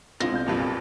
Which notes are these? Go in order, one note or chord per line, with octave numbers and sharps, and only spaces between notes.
F2 B2 G#3 C4 E4 F4 A#6
C2 F4 G6
B1 G2 A#2 C4 A#4 B4